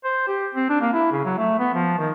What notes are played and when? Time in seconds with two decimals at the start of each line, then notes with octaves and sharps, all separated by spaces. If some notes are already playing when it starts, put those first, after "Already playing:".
0.04 C5
0.28 G4
0.54 C4
0.70 D4
0.81 A#3
0.93 E4
1.12 C#3
1.25 F#3
1.38 A3
1.59 B3
1.74 F3
1.98 D#3